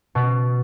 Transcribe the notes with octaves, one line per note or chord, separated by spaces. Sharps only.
B2